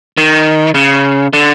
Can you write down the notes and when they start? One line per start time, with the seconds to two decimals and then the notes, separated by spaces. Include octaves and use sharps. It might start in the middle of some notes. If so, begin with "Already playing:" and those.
0.18 D#3
0.74 C#3
1.33 D3